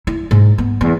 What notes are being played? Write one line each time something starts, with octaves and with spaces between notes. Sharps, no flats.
E4
G#2
B3
E2